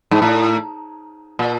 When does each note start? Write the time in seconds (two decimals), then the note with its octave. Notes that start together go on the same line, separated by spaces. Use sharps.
0.11 G#2
0.22 A2
1.39 A#2